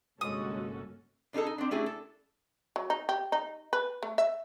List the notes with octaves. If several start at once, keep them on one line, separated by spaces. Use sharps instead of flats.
G1 C3 G#3 A#3 C#4 F#4 A4 D#6
B2 D4 D#4 G#4 A4
D#4
C4 D4
A3 C#4 D4 E4 G4 G#4
A4
F#3
D#4
G4
D#4
B4
A3
E5